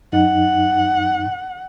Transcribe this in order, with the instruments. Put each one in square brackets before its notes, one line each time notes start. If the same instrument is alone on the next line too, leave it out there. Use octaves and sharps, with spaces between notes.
[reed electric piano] F#2 D#4 [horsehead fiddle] F#5